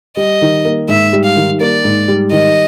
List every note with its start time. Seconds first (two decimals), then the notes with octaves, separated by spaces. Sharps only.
0.17 G3 D#5
0.42 D#3
0.65 A#3
0.88 G#2 E5
1.13 G3
1.25 F5
1.36 D#3
1.60 A#3 D5
1.84 G#2
2.08 G3
2.32 D#3 D#5